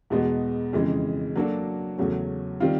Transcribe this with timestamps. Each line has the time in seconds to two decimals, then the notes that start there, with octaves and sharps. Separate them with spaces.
0.10 E2 B2 G#3 B3
0.73 F2 C#3 E3 G#3
1.36 F#3 A#3 D4 F#4 A4
1.98 E2 C#3 F#3 A3 C#4
2.60 D#3 G3 C4 F4